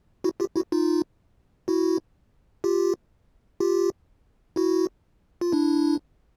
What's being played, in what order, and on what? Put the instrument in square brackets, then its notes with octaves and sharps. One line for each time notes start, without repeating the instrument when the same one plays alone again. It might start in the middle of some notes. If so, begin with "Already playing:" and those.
[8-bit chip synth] E4 F#4
F4 G4
E4 F#4
D#4 F4
E4 F#4
F4 G4
F4 G4
E4 F#4
F4
D4 E4